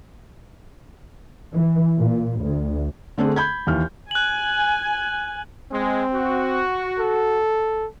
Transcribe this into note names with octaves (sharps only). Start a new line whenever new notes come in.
E3
A#2
D2
D3 A3 C4 D4 G#4
B5 G6 G#6
D#2 E3 F6
G#5 F#6 F#7
G#3 C4
F#4
A4